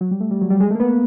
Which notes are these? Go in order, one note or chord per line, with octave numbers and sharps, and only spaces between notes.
F#3
G3
A3
G3
F#3
G3
G#3
A3
A#3
B3